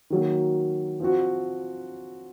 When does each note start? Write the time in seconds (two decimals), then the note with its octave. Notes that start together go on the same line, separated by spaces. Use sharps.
0.10 D#3 F#3 A#3
1.00 F3 C4 F#4